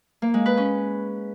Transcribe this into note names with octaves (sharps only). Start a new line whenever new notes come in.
A#3
G#3
B4
C#4